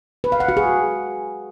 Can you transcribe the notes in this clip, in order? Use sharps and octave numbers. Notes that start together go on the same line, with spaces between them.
B4
F5
F#5
F#4
G#4